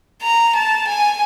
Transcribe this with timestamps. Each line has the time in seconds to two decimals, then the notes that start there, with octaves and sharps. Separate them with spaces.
0.23 A#5
0.55 A5
0.87 G#5